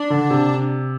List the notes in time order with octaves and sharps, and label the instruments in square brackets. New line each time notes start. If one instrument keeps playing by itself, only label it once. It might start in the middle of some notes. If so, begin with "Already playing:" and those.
Already playing: [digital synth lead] D4
[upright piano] D3
C3